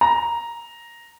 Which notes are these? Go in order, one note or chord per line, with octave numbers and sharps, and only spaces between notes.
A#5